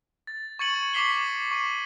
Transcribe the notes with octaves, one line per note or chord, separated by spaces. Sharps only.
A6
C#6 G#6 A6 C#7 D#7 F#7
C#6 D6 B6 C7 G7
C#6 D#7